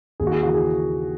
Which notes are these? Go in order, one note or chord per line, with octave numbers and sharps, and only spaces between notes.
D#2 G#4
F#4
G#4
C#3 E3 F#4
G#4